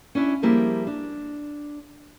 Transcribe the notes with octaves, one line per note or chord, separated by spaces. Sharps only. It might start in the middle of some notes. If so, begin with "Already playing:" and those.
C#4 D4 E4
F3 G3 A#3 E4 G4 G#4
D4